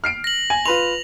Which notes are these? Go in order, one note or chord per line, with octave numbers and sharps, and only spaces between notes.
F6 C7 D7
A#6 F#7
G#5
F4 B4 C6 F7